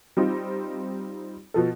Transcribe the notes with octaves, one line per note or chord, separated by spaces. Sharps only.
G3 C4 D#4 F4
B2 F3 A4